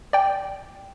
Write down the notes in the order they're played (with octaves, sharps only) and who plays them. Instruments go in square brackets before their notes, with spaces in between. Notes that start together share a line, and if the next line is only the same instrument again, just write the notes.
[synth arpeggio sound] D5 G5